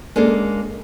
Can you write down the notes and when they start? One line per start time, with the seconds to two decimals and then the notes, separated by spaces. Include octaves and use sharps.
0.16 G#3 A#3 C#4 D4 G#4 A4